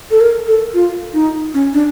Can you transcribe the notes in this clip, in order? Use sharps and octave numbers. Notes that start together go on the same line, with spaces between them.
A4
A#4
A4
F4
D#4
C#4
D4